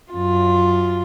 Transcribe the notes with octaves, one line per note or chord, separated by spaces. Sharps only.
F#2 F4